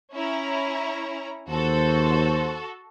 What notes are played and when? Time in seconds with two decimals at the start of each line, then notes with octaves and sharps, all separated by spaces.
0.12 C#4 E4 A#5
1.49 D#2 F#4 A4 C5